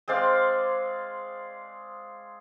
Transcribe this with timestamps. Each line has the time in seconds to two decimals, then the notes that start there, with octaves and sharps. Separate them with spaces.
0.08 G#3 C4 D5 F5